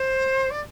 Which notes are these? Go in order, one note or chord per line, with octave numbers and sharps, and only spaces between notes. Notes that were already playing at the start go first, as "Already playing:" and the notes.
Already playing: C5
D5